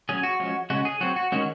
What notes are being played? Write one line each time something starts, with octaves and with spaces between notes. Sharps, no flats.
F#3 C#4 G#4
F#4
F3 G#3 C#4
C#3 G#3 C#4 F#4
G#4
F#3 C4 F#4
F#4
D#3 G#3 C#4 F#4